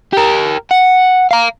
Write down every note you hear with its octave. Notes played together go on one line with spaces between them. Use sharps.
G4 A#4
F#5
F5 A#5